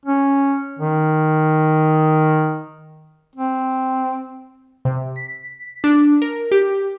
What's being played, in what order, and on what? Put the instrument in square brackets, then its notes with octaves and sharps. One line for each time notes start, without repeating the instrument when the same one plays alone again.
[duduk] C#4
D#3
C4
[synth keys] C3
B6
D4
A#4
G4